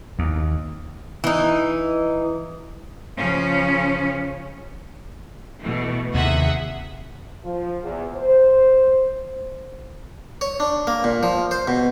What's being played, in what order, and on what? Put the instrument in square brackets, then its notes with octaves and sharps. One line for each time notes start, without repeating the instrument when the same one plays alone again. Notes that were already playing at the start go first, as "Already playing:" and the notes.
[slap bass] D#2
[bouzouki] E3 D#4
[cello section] C#3 F3 C#4
[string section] B2 E3 A3
[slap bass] D#2 C3 [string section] G#4 E5 F#5
[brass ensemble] F3
E2
C5
[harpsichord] C#5
D4
A#3
A#2
F3
C5
B2